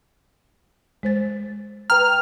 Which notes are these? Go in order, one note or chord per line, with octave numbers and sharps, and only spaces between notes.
G#3 C5 A6
B4 G5 A#5 F6